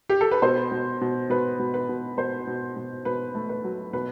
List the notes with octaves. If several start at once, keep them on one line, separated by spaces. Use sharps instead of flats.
G4
A4
B4
B2 C5
B2
B2
B2 B4
B2
B4
B2
B2 C5
B2
B2
B2 B4
A3
B4
F#3
B2 B4